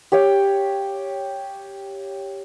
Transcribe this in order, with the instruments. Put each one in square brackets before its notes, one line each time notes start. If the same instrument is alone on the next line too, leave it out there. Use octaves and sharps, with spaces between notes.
[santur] G4 C#5 F5 G5